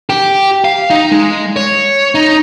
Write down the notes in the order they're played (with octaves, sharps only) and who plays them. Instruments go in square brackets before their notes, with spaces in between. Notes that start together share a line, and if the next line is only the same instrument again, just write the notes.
[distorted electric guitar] G4
F5
D#4
G#3
C#5
D#4